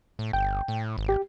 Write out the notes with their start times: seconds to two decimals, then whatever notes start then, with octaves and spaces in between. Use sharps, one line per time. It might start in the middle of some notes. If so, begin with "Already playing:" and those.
0.19 A2
0.33 G1 G5
0.68 A2
0.98 G#1
1.09 G4